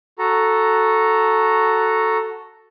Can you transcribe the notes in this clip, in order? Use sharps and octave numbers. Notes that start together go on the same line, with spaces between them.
F#4 A4 A#5